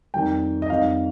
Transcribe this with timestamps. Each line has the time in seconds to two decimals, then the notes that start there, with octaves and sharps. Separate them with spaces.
0.14 F2 D#3 G3 G5
0.62 D#5
0.70 F2 D#3 G3 F5